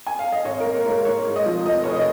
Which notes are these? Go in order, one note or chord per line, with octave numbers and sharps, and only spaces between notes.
G#5
F5
D#5
G#1 C#5
A#4
A#3
C#5
G#2 A#4
G#2 C#5
G#2
D#5
F3
F1 D#5
F1 C#5
D#5